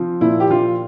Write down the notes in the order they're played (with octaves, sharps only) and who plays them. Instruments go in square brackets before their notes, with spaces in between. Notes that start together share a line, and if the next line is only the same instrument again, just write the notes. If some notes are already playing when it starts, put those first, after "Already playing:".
Already playing: [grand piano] F3 C4
[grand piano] A#2 [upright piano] E4
[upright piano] G4
[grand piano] F3 [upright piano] F4